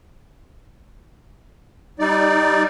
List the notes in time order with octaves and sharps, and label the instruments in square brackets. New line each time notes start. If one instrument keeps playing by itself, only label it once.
[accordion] G3 D#4 D5